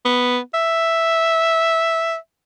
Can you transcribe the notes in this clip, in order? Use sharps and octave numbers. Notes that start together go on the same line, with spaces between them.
B3
E5